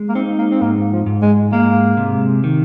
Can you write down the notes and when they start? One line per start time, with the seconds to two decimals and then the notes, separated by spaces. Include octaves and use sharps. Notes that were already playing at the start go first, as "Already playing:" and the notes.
Already playing: G#3
0.09 A#3
0.15 C4 D#4
0.38 A#3
0.51 C4
0.61 G#2 A#3
0.92 F3
1.06 G#2
1.22 G#3
1.52 G#3 A#3
1.97 C3
2.44 D#3